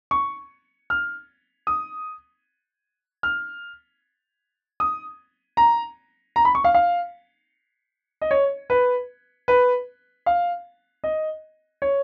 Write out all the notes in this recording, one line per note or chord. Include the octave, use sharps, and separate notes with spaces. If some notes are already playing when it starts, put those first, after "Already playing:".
C#6
F6
D#6
F6
D#6
A#5
A#5
B5
C#6
F5
F5
D#5
C#5
B4
B4
F5
D#5
C#5